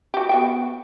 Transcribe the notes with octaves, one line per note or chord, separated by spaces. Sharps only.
F#4 G4
B3 F#4 G5